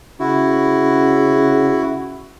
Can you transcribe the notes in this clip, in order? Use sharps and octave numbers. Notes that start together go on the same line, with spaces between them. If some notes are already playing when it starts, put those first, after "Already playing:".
C#3 E4 F#4